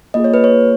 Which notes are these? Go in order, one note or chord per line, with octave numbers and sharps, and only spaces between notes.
A#3 F4 G#4 D#5
C#5
B4
C#5